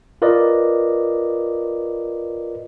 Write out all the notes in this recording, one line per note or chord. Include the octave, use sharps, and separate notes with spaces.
F4 A#4 B4 D5 D#5